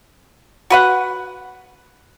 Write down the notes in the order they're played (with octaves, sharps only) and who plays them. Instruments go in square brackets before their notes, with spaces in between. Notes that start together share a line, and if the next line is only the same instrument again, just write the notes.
[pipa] F#4 B4 F#5